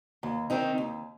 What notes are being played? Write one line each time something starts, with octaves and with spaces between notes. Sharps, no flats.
D#2
D#3 C4 D#4
D#2